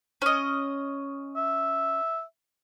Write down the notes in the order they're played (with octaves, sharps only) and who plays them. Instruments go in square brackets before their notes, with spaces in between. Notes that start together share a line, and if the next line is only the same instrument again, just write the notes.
[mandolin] C#4 D#5
[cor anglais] E5